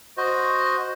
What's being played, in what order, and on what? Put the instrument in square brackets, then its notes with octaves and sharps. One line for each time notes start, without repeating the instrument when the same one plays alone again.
[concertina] F#4 C5 D#5